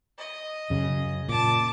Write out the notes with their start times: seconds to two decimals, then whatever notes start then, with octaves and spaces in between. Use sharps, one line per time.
0.18 D#5
0.70 F#2 C#3
1.29 A#2 A5 D6